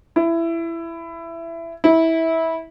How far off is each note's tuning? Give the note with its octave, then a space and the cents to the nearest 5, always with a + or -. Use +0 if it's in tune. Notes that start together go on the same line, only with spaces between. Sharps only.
E4 +15
E4 -20